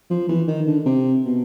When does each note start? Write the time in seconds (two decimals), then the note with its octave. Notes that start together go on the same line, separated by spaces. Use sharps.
0.10 F3
0.29 E3
0.48 D#3
0.67 D3
0.86 C3
1.25 B2